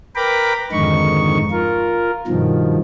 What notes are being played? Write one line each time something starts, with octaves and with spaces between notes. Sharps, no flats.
A#4 B4 G5 A#5 B5 D6
F2 G#2 D3 D#3 D#4 C#6
F4 A#4
G2 B2 D#3 F3